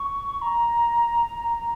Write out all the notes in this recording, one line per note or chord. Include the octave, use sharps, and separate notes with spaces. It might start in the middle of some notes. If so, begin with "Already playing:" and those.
Already playing: C#6
A#5